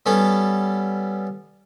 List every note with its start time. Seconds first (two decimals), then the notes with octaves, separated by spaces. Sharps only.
0.06 G3 B3 C#4 A4